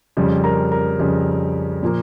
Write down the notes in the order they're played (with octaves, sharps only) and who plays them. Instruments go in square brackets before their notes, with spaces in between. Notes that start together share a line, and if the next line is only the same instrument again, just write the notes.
[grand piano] F2 C#3 G3
A#4 A#5
A#4 A#5
F2 C#3 G3
A#2 F3 A#3